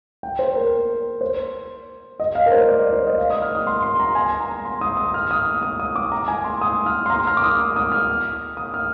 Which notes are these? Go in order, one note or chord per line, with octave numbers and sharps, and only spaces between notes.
G5
C5
A#4
C5
D#5
F5
A#4
C5
D5
D5
C5
D#5
F5
D#6
F6
D#6
C6
C6
A#5
G#5
A#5
C6
D#6
D#6
F6
D#6
D#6
D#6
D6
A#5
G#5
C6
D#6
F6
C6
A#5
F6
D6
D#6
F6
D#6
F6
D#6
F6